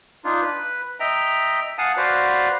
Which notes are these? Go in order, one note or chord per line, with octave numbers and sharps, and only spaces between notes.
D4 D#4 F4
B4
D#5 E5 G5 A#5
F5 F#5 G#5 A5 D#6
F#4 B4 C5 D5 F5